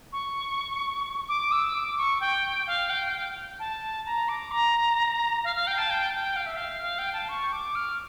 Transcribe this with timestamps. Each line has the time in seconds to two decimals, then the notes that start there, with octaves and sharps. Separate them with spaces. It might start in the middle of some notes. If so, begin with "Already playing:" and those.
0.12 C#6
1.28 D6
1.51 E6
1.74 D6
1.97 C#6
2.20 G5
2.67 F5
2.89 G5
3.59 A5
4.05 A#5
4.28 D6
4.51 A#5
5.44 F5
5.56 F5
5.67 G5
5.78 A5
5.90 G5
6.14 G5
6.36 F5
6.46 E5
6.56 F5
6.82 F5
6.98 G5
7.13 A5
7.28 C#6
7.52 D6
7.75 F6